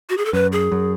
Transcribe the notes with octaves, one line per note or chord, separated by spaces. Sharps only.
F#4
G#4
A4
F#2 B4
G#4
F#2